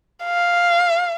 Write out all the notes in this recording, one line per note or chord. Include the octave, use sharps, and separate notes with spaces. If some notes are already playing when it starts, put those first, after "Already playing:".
F5